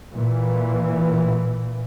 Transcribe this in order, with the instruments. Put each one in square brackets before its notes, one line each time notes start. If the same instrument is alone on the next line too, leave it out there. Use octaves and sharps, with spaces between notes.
[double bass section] A#2 E3